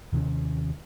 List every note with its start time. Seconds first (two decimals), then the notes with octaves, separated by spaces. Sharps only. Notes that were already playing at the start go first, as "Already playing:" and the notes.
0.13 D#2 C3 D#3 C#4